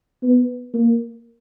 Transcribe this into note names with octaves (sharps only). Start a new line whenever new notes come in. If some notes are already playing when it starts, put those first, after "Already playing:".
B3
A#3